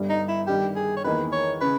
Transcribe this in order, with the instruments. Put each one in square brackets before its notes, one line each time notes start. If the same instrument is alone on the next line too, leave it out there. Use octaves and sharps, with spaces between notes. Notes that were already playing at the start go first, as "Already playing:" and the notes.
Already playing: [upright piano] G1 G2 G3
[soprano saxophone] D#4
E4
[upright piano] G1 G2 D#3 G3 [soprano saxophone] G4
[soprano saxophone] G#4
C#5
[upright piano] E2 D#3 A#3 [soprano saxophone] B4
[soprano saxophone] C#5
[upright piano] C#3 [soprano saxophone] B4